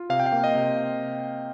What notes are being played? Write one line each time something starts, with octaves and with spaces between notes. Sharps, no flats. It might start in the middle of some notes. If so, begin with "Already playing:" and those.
Already playing: F4
C3 F5
G5
F5
A#3
D#5
C3